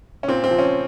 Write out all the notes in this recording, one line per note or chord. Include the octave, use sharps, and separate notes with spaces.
C#4
A#2 C4
C4
F3
C#4